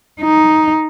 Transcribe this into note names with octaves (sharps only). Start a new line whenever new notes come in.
D#4